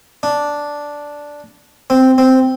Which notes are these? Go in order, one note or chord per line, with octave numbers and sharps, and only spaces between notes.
D4
C4
C4